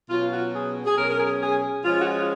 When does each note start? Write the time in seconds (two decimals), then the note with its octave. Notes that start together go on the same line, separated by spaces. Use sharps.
0.09 B2 F#3 C#4 F4
0.31 F#4
0.54 G#4
0.86 G#4
0.96 B2 F#3 C#4 A#4
1.10 A#4
1.19 G#4
1.40 G#4
1.84 F3 G#3 C#4 F4
2.00 F#4
2.06 F4